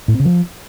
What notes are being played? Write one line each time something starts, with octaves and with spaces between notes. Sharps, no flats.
A2
C4
C#3
F3